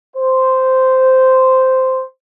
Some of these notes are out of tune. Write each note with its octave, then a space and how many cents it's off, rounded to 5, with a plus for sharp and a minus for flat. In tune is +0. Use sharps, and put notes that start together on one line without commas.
C5 -10